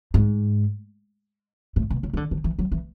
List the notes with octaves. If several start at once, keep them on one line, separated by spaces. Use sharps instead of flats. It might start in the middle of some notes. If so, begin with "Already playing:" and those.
G#2
A2
B2
C#3
E3
D3
D3
E3
F#3
E3